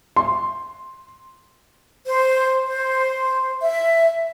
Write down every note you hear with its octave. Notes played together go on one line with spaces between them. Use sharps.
C6
C5
C5
E5